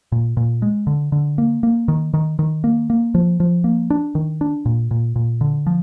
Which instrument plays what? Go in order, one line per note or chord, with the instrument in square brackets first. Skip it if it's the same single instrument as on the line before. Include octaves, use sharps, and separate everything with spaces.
[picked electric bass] A#2
A#2
G#3
D3
D3
A#3
A#3
D#3
D#3
D#3
A#3
A#3
F3
F3
A#3
D4
D#3
D4
A#2
A#2
A#2
D3
F3